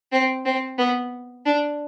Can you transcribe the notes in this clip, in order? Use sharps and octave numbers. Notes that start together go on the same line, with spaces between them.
C4
C4
B3
D4